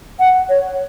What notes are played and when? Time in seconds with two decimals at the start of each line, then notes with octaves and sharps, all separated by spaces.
0.20 F#5
0.49 C#5